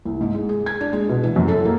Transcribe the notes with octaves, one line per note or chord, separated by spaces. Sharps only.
C2
G#2
G#3
G#4
G#6
D4
G#3
B2
E3
F#2
A4
A#3